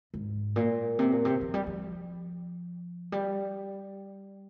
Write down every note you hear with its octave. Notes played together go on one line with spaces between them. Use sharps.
G#2
A#2
C3
A#2
C3
F3
G3
F3
G3